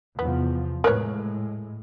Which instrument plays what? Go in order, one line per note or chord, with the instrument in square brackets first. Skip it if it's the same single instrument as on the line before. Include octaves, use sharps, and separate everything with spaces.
[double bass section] E2 C3 F3 [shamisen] B3
[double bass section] A2 G#3 [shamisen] A#4 B4 C#5